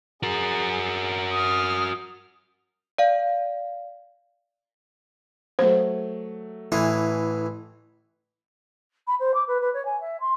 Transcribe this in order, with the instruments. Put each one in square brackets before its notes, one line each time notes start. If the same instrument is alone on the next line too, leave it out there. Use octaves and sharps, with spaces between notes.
[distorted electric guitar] F#4 A#4 [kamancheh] G#4
[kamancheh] D#6 F6
[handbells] D5 F5
[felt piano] F#3 A3 [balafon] C5
[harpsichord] A1 E3 G#4 [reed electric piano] E4
[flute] B5
C5
D6
B4
B4
C#5
G#5
E5
C6